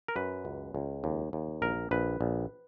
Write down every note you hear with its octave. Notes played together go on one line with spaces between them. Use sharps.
A#4
F#2 B4
C#2
C#2
D#2
D#2
A#1 A#4
A#1 B4
A#1